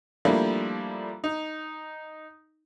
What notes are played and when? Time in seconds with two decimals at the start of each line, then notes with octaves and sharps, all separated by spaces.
0.25 F3 G3 A3 A#3 D4 E4
1.24 D#4